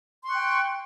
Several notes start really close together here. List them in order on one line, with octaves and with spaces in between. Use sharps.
C6 C#6 F#6 G5